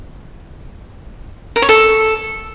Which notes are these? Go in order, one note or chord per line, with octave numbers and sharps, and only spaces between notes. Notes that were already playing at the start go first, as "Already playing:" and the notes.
A#4
C#5
A4